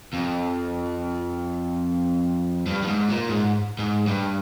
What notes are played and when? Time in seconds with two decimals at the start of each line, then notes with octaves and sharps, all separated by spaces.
0.14 F2
2.66 G2
2.83 G2
2.87 G#2
3.09 A#2
3.29 G#2
3.79 G#2
4.07 G2